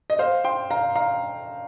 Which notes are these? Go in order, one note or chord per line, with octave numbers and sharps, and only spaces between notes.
D#5
C5 F5
G5 C6
F5 A#5
F5 A#5